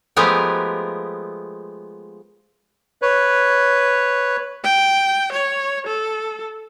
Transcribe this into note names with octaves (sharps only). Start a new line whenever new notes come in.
F3 G#3 A3 B3 G4 A#4
B4 C#5
G5
C#5
A4